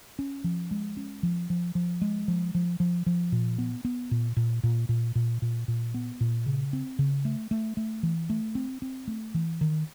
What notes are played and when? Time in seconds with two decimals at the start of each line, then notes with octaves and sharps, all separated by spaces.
0.19 C#4
0.44 F3
0.71 G#3
0.97 C#4
1.23 F3
1.50 F3
1.75 F3
2.02 G#3
2.28 F3
2.55 F3
2.80 F3
3.06 F3
3.32 A#2
3.58 B3
3.85 B3
4.11 A#2
4.37 A#2
4.63 A#2
4.89 A#2
5.15 A#2
5.42 A#2
5.68 A#2
5.94 B3
6.21 A#2
6.46 C#3
6.73 C4
6.99 C#3
7.25 A3
7.51 A3
7.77 A3
8.03 E3
8.30 A3
8.55 C4
8.82 C4
9.08 A3
9.34 E3
9.61 D#3